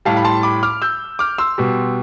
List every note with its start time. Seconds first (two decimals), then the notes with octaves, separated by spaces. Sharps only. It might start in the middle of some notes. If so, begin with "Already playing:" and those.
0.05 A2 G3 F5 A5
0.17 B5
0.25 A5 C6
0.43 B5 D6
0.63 D6 F6
0.82 E6 G6
1.19 D6 F6
1.38 C6 E6
1.58 B2 G3